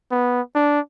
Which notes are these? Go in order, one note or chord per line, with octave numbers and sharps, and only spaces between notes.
B3
D4